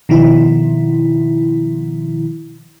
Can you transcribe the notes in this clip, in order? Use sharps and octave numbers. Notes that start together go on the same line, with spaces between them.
B2 D#3 F3 E4